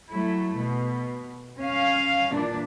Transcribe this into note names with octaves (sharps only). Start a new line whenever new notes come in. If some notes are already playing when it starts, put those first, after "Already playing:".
F#3 A3 E4
B2
C#4 F5
A#2 E3 D4